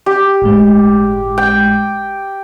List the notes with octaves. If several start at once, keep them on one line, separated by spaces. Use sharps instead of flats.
G4
G1 A2 G#3
G5